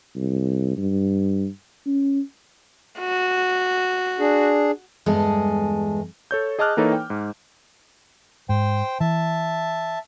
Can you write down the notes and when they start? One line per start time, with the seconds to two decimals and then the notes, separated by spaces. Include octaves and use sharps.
0.16 C2
0.77 G2
1.87 C#4
2.99 F#4
4.19 D4 G#4
5.06 E2 G2 G#3 G#4 A4
6.31 A4 C#5 G6
6.59 G#4 D#5 A5 D6 F6 F#6
6.77 E3 A#3 D#4 A4 B4 C#5
6.93 G5
7.10 G#2
8.49 G#2 C5 G5
9.00 E3 E5 A5